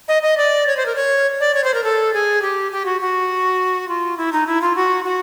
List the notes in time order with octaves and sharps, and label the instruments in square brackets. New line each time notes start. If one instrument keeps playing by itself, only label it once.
[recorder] D#5
D#5
D5
C#5
C5
A#4
C#5
D5
C#5
C5
A#4
A4
G#4
G4
G4
F#4
F#4
F4
E4
D#4
E4
F4
F#4
F#4